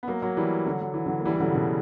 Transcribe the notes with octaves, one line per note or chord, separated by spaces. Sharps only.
B3
F#3 A#3
F#3 A#3
E3 G3
D3 F#3
F#3
E3
D3 F#3
A#3
E3 G3
E3
D3 F#3
C#3
B2 D3